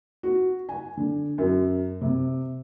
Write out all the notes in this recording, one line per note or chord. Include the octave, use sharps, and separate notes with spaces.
F#4
G#5
D3
F#2
C3